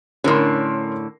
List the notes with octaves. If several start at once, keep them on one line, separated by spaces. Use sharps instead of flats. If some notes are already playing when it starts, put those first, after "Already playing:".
A2 D3 C#4 A#4 C6